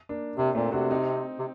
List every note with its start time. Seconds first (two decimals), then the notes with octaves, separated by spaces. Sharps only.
0.09 A#3 D4
0.37 C3 A#3 D4
0.55 A#2 A3 C4
0.72 C3 D4 F#4
0.91 C4 D#4
1.39 C3